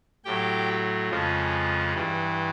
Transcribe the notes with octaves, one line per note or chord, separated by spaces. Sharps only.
A2 F#3 G4 G5
F2 C#3 F3 G#3
G2 E3 G3